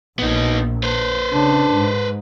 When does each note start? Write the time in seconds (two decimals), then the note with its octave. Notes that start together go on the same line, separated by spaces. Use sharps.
0.19 A#1 A#2 B3 D#4
0.83 B4 C5
1.32 C#3 D4
1.73 G#2